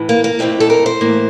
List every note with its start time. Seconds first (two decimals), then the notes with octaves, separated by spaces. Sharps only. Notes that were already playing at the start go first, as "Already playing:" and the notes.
Already playing: A2 E3
0.09 A#3
0.24 A#3
0.39 F2 C3 E3 A3 C4
0.60 A4
0.70 A#4
0.86 C5
1.01 A2 E3 A#3